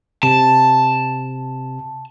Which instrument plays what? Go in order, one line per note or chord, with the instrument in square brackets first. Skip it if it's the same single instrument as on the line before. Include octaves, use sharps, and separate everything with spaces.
[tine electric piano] C3 [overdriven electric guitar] A5